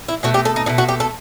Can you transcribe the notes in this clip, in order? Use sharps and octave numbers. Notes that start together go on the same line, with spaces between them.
E4
B2 A3 F#4
G4
A4
D#4
B2 A3 D#4
F#4
G4
A4